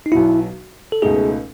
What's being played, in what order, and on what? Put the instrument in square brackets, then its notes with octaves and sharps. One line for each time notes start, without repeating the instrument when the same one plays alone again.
[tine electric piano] D#4
[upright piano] B1 B2 F#3 [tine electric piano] E4
[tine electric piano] A4
[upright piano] C#2 B2 A3 D#4 [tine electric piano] G#4